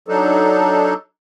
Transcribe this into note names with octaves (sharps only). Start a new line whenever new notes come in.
F#3 D4 D#4 A4